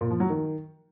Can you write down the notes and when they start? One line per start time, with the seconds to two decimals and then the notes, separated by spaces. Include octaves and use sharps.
0.01 A#2
0.10 F3
0.20 F#3
0.30 D#3